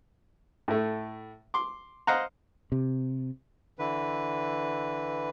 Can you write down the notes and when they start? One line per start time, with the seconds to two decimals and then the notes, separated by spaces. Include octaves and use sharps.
0.68 A2 A3
1.54 C6 D6
2.07 C5 D#5 F5 F#5 A#5
2.72 C3
3.79 D3 E3 B4